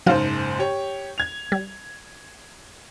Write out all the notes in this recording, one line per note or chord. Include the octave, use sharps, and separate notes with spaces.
F#1 G#2 F#3 C5 F5
G4 C#5
G#6 F7
G3